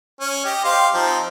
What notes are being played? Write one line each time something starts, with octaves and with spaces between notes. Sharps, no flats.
C#4
G4 D#5
G4 C5 F5
F3 C4 D#4